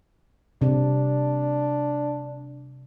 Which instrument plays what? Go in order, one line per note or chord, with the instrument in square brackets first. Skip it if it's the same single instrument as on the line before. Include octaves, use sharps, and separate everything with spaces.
[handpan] C3 [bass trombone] D4